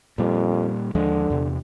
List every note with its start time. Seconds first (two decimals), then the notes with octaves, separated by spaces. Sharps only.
0.18 F2 A#2 G3
0.95 D#2 D3 F3 G#3
1.30 E2 C3